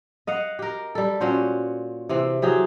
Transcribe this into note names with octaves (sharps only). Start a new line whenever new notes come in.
D#5 F5 F#5
G4 A#4
G3 A4
A#2 C#4 F#4 C5
C3 E3 C4
E3 F#3 G4 G#4